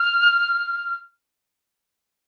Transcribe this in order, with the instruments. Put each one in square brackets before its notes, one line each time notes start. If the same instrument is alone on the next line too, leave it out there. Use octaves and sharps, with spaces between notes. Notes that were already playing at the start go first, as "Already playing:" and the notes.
Already playing: [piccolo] F6